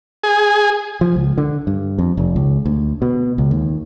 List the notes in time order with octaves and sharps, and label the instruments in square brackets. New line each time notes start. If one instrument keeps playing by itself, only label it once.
[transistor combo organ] G#4
[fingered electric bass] F3
C#2
D3
G2
F2
F1
C#2
D2
B2
C#2
D#2